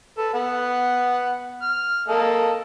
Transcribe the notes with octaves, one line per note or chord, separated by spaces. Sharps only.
A4 B4
B3 F#5
F6
A#3 A4 D#5